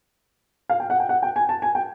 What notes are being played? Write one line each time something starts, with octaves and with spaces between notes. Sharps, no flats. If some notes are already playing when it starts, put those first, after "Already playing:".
F5
G5
F#5
G5
F#5
G5
G#5
A5
G#5
G5